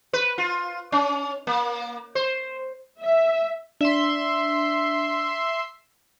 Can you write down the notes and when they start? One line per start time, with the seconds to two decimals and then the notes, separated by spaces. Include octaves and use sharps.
0.13 B4
0.38 F4
0.92 C#4
1.47 A#3
2.15 C5
3.01 E5
3.81 D4 E5 C6